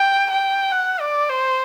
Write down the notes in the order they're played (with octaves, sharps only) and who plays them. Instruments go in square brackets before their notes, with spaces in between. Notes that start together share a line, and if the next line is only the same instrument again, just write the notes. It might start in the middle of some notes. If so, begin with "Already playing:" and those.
Already playing: [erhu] G5
G5
F#5
D5
C5